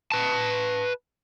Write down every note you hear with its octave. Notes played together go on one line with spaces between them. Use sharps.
B4 A5